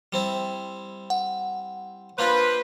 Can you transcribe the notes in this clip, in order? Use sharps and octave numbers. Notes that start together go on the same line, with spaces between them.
G3 C4 E4
F#5
A#3 D4 F4 B4 C5